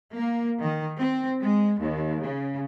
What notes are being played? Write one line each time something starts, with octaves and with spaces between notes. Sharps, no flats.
A#3
D#3
C4
G#3
D#2
C#3